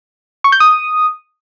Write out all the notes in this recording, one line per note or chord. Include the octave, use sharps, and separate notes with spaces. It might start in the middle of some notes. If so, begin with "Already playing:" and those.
C#6
G6
D#6